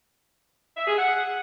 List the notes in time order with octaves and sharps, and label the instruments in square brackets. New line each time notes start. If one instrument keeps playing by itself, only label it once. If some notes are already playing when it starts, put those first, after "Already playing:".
[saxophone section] E5
G#4
F#5